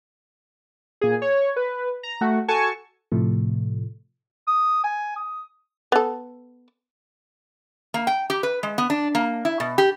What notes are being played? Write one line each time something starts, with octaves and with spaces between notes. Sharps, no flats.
A#2 G#4
C#5
B4
A#5
A3 F#4
F#4 A4 G#5 A5 C#6
A2 C3 F3 A3
D#6
G#5
D#6
B3 A4
A#3
G5
G4
B4
G#3
B3
D4
A#3
E4
B2
G4